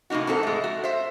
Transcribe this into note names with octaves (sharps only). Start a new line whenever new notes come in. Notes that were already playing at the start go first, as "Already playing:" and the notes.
A2 C3 A#3 D#4 F#4
F2 G#2 C4 A4
G#3 A3
F#4
C5 E5